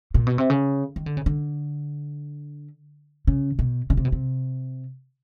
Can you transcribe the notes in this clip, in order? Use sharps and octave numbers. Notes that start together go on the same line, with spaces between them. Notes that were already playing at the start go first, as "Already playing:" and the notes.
A#2
B2
C3
C#3
D#3
D3
C#3
D3
C#3
B2
C#3
C3
B2
C3